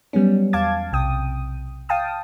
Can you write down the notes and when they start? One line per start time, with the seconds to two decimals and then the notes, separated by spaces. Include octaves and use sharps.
0.13 F#3 G3 B3 C#4
0.53 E2 F5 A5 D6 G#6
0.93 B1 C3 G5 D#6
1.89 F5 G5 A5 D#6